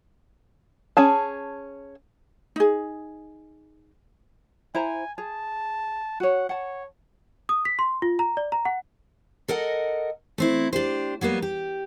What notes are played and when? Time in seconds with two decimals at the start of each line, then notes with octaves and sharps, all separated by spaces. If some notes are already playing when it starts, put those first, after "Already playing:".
0.97 C#4 G#4 A5
2.56 D#4 G#4
4.75 E4 C5 G#5 A#5
5.18 G#4 A5
6.20 F#4 C#5 F#5
6.49 C#5 F#5 A5
7.49 D#6
7.65 B6
7.79 C6
8.02 F4
8.19 A#5
8.37 D5
8.52 A#5
8.65 F#5
9.48 A4 A#4 D#5 F#5
10.38 A3 C4 E4
10.73 D4 G4 C5
11.21 F#3 G3 A#3 B3
11.42 G4